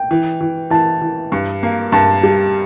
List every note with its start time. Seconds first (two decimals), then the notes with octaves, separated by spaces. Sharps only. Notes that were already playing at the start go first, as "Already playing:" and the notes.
Already playing: G5
0.11 E3
0.41 E3
0.70 E3 A5
1.02 E3
1.32 G2
1.63 A#3
1.92 G2 A5
2.23 G3